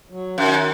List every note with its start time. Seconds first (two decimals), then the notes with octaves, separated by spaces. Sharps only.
0.10 F#3
0.37 F#2 D#3